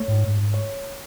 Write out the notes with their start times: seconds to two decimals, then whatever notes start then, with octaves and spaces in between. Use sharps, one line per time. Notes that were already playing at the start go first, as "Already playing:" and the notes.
Already playing: A3 C#5
0.08 G#2
0.24 G#2
0.38 G#2
0.54 C#5